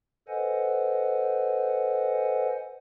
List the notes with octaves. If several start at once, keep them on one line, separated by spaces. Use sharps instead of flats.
A4 B4 C5 D#5 F#5 G#5